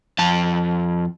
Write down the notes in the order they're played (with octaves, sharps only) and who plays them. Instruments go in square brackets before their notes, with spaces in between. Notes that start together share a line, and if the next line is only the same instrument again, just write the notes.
[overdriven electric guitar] F2 A5